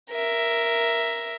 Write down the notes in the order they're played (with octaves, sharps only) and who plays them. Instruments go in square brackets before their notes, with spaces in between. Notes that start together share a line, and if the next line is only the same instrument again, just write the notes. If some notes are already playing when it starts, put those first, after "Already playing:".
[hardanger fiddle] A#4 E5